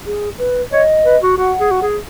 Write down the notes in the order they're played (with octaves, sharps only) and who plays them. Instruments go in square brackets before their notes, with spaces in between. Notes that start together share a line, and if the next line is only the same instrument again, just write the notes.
[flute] G#4
B4
[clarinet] C#5 [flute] D#5
[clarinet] B4
F#4
[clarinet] F#4 [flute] F#5
[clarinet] G#4
F#4
G#4